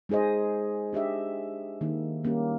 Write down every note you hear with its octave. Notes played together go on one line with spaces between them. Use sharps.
G#3 D#4 G#4 C5 D#5
D4 G4 D#5 E5
D#3 A#3 D#4
G3 A#3 C#4 G4